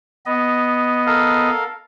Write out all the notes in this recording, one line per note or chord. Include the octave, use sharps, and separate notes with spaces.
B3 D#5
A4 A#4 F5